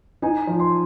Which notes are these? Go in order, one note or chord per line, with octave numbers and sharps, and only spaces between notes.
D#4 G#5
F3
C6